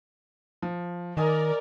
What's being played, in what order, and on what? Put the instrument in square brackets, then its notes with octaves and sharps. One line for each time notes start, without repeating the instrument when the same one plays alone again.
[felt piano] F3
[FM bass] D#3 [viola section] A#4 D5 [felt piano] D#5 G#5 D#6